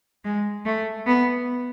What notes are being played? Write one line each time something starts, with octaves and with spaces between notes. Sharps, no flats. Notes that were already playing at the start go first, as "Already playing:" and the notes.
G#3
A3
B3